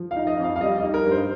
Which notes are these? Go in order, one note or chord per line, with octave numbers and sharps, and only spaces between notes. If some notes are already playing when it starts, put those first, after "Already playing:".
Already playing: F3
F5
D#4
D#5
F2 F5
F5
G3 D#5
D#5
D#4
A#4
G2 C5